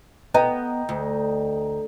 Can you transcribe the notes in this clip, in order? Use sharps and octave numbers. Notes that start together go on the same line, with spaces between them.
B3 D#5 G5 A#5
D2